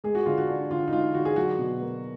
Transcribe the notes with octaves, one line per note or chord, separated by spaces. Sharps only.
G#3 G#4
F#4
D3 F4
F#4
D4
D3 F4
D#4
G#3 F4
D3 F#4
G#4
F#3 F#4
B2
A#3